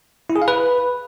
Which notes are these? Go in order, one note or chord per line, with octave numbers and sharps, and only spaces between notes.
E4
G#4
F5
B4